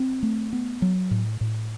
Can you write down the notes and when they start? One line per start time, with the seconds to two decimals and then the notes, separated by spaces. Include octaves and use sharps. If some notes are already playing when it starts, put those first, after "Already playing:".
Already playing: C4
0.23 A3
0.53 B3
0.82 F#3
1.11 A2
1.41 A2